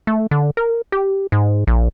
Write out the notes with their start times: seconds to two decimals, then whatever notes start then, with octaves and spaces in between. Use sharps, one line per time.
0.07 A3
0.31 D3
0.57 A#4
0.92 G4
1.32 G#2
1.67 A#1